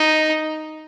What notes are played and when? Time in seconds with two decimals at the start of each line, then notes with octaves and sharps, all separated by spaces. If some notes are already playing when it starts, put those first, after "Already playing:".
Already playing: D#4